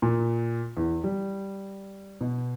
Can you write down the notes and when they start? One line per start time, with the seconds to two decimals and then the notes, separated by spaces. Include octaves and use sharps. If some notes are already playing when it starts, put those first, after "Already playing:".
0.02 A#2
0.77 E2
1.04 G3
2.21 B2